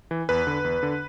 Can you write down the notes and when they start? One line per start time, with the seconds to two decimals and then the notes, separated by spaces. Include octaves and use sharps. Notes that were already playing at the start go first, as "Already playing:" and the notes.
0.11 E3
0.29 E2 B4
0.47 D3
0.64 E2
0.83 D3